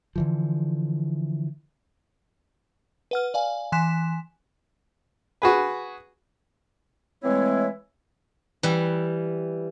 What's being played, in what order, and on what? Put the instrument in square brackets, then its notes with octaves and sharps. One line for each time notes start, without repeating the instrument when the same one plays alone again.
[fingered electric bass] D3 E3 F3
[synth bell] B4 F#5 F6
D5 F5 G#5
E3 G#5 C6 F#6 B6 E7
[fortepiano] F#4 G#4 B4
[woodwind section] E3 G#3 A3 C4 E4 C#5
[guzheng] E3 G3